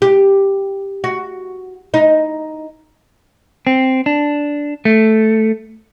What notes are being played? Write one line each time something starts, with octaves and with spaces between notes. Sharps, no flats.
G4
F#4
D#4
C4
D4
A3